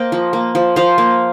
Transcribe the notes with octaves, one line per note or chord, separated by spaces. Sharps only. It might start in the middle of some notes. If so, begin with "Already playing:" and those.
Already playing: A#3 C5 D#5 F5 G5
F3
A#3
F3
F3 C5 F5
A#3